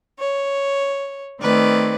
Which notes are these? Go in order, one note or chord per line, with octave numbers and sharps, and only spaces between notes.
C#5
D#3 A3 C4 B4 D5